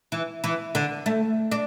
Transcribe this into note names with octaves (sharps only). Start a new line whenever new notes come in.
E3
E3
D3
A3
D4